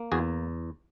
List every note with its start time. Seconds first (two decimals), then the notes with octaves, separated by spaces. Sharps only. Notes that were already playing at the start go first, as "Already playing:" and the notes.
Already playing: A#3
0.12 E2 F#4 G#4